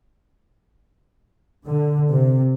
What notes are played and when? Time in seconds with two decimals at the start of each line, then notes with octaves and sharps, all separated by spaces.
1.66 D3
2.10 C3